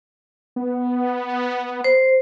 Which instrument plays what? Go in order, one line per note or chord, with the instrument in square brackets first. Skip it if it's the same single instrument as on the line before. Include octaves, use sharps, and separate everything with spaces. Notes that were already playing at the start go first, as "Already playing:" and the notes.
[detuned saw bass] B3
[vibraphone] C5